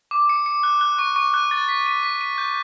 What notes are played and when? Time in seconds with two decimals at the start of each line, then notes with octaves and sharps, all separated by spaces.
0.11 D6
0.29 C#7
0.46 C#7
0.63 F#6
0.81 F#6
0.99 C#6
1.16 C#6
1.34 F#6
1.51 A6
1.68 B6
1.86 D#7
2.03 B6
2.21 D#7
2.38 G6